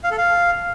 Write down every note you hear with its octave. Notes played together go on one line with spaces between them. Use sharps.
F5
A4
F5